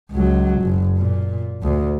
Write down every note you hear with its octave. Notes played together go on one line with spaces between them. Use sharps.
C#2 F#3
F#1
A#2
D2